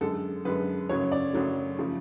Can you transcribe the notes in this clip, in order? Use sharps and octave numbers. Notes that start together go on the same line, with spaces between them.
F#2 D3 G#3 A4
F#2 D3 G#3 B4
F#2 C#3 F#3 A3 C#5
D5
F#2 C#3 F#3 A3
C#3 F3 A3